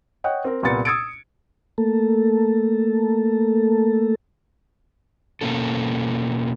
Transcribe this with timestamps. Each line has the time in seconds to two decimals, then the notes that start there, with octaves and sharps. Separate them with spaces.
0.24 C#5 D#5 F#5 G5
0.44 C4 A#4
0.63 C2 A#2 B3 A6 C#7
0.85 D#6 E6 G#6 A6 C#7 D7
1.78 A3 A#3 A4
5.41 B2 A#3 C#4 A4